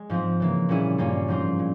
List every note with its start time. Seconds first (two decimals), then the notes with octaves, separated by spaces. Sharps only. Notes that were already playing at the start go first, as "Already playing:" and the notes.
Already playing: G#3
0.10 G#2 F3 C4
0.40 C#3 E3 A#3
0.69 A#2 G3 C#4 E4 G#4
0.98 G2 G3 A#3 C#4 F4
1.28 G#2 F3 C4 F4 C5
1.59 A#2